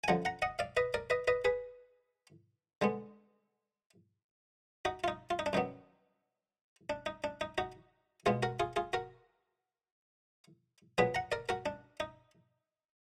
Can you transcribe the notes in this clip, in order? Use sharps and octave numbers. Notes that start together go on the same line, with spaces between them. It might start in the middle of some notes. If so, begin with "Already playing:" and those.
G#5
F#2 D3 F3 F#5 A#5
F#5 A#5
D#5 F#5
D5 F5
B4 D#5
A#4 D5
B4 D#5
B4 D#5
G#4 B4
D3 G#3 B3
D#4 F#4
F4
D#4
F4
D#4
D4
F#2 D#3 F#3 B3 D#4
D4
D#4
D4
D#4
D#4 F#4
B2 G#3 B3 F4 G#4
F#4 A#4
F4 G#4
F4 G#4
F#4 A#4
A#2 F#3 B3 G#4 B4
F#5 A#5
A#4 D5
F#4 A#4
D4
D#4